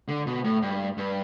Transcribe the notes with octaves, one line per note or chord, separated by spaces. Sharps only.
D3
B2
A2
G2
G2